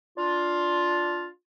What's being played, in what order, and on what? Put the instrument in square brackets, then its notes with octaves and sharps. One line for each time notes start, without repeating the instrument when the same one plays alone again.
[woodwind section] D4 F4